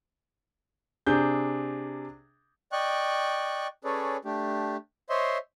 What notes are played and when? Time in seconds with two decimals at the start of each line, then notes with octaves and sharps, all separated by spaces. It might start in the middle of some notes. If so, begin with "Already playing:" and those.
1.07 C3 D4 G#4 G6
2.72 D5 D#5 G5 C#6 F#6
3.84 C#4 G#4 A4 B4 C#5 D5
4.25 A3 D4 G4
5.10 C5 C#5 D#5 E5 C6